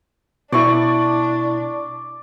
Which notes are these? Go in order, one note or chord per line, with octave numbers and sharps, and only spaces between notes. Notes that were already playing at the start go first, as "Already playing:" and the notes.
B2 D4 E4 D5 C#6